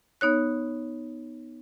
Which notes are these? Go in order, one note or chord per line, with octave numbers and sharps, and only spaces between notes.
B3 D#4 C#5 F#6